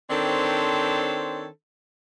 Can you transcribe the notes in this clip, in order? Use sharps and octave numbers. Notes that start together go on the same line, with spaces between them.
D#3 C4 D4 A4 C5 C#5